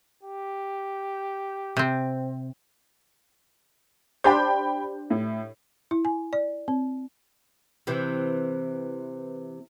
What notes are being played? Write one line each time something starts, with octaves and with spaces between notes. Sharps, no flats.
G4
C3 C4
D4 G4 C5 G5 B5 G6
A2
E4
G#5
D5
C4
C3 E3